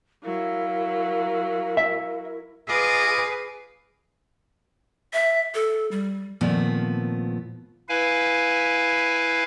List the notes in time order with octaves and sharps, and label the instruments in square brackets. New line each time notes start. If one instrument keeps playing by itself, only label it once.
[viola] F#3 [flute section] E4 A#4 [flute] F5
[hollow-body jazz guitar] E5
[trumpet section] F4 D#5 D6 [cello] G#4 B4
[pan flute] E5
A4
G3
[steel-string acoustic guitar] A#2 D#3 F3 A3 B3 C4
[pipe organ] E4 B4 F5 G#5